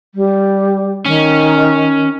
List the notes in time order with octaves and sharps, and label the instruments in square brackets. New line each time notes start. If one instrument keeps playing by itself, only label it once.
[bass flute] G3
[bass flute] D#3 [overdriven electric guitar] C#4